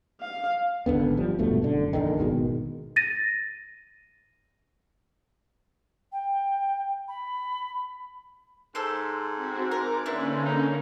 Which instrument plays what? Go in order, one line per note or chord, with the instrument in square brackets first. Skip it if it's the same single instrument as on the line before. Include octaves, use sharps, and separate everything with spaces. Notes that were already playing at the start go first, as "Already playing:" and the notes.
[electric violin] F5
[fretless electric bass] G#1 E2 D3 B3
F3 G3
E1 G2 B2 A3
F#1 D3
A#1 D#2 D3 D#3
G#1 B2 D#3 G#3
[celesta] A6 A#6 D#7
[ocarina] G5
B5
[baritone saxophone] G#2 [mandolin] A4 C5
[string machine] C4 F#4
[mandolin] A#4 [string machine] D6
[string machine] D3 A#3 C#4 [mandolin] D4 E4 B4
[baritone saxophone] D#4